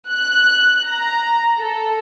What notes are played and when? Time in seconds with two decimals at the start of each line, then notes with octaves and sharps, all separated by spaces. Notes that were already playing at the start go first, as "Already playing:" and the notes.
0.11 F#6
0.86 A#5
1.58 A4